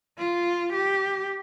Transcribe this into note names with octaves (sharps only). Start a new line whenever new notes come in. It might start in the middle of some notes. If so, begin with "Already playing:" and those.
F4
G4